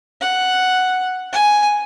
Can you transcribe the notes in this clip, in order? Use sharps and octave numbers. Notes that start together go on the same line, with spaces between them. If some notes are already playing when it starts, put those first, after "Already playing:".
F#5
G#5